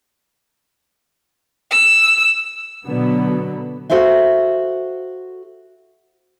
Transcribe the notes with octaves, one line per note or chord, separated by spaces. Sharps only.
E6
B2 D3 F#3 B3
F#4 G#4 A4 C5 E5 F5